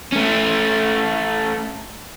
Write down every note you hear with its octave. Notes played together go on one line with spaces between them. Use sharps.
A3 C#4